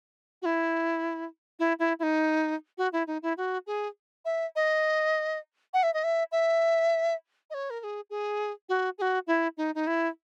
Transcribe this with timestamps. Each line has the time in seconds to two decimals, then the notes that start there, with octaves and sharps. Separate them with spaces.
0.42 F#4
0.45 E4
1.59 E4
1.79 E4
1.99 E4
2.03 D#4
2.78 F#4
2.93 E4
3.07 D#4
3.23 E4
3.37 F#4
3.67 G#4
4.25 E5
4.56 D#5
5.74 F#5
5.83 E5
5.94 D#5
6.04 E5
6.32 E5
7.50 D#5
7.54 C#5
7.70 A#4
7.80 A#4
7.84 G#4
8.10 G#4
8.69 F#4
8.98 G#4
9.02 F#4
9.27 E4
9.57 D#4
9.75 D#4
9.87 E4